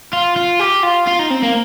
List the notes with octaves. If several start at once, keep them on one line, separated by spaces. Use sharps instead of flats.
F4
F4
G4
F4
F4
D#4
C4
A#3